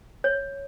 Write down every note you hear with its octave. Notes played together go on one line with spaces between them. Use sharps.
C#5